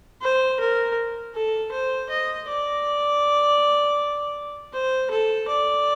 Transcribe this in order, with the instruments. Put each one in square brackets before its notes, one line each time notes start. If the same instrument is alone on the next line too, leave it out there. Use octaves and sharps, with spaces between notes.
[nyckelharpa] C5
A#4
A4
C5
D#5
D5
C5
A4
D5